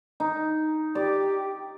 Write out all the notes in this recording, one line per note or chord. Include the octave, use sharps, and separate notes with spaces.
D#4
G4 D5